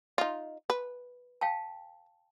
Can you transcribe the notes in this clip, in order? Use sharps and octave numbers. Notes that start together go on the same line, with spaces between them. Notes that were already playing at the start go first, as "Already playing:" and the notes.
D#4 F4
B4
F5 G5 A5